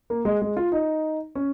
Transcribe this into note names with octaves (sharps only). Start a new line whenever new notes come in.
A#3
G#3
G#3
F4
D#4
C#4